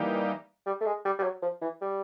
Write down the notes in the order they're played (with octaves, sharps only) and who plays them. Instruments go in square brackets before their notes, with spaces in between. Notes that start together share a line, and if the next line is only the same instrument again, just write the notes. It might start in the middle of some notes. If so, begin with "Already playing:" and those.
Already playing: [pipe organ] E3 G3 A#3 D#4 G4
[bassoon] G3
A3
G#3
G3
G3
F#3
F3
E3
G3